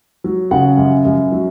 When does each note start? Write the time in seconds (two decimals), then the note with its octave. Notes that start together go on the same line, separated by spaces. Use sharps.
0.24 F#3
0.51 C#3 F#5
0.78 F#2
1.05 F#2
1.32 F#3